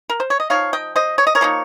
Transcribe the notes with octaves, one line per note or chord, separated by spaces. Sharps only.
A#4
C5
C#5
D#5
F3 A#3 D#4 C#5 F5
D#5 G5
C5 D#5
C#5
D#5
A#4 C#5
F3 A#3 D#4